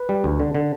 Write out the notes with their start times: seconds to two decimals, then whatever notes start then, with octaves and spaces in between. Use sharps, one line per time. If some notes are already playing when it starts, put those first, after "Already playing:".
Already playing: B4
0.09 G3
0.24 D2
0.40 D3
0.55 D3